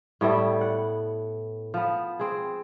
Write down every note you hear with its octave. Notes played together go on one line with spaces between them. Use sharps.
A2 G3 B3 E4
F#5
F3 B3
C4 G#4